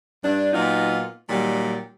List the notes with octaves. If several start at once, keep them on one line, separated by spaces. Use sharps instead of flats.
G2 D4
A#2 F#3 B3 D#4 F4
A#2 D#3 F#3 G3